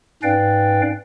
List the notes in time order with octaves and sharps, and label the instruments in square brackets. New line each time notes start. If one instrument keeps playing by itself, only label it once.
[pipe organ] G#2 C#4 B4 D5 F5 G5